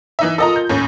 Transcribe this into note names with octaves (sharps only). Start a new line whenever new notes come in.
E3 D#4 E5
F4 A4 A#4 D#5 A#5 D#6
G6
D#2 A2 C#4 C#5